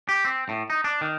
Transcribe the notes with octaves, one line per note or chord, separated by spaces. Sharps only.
G4
C4
A2
D#4
D4
D#3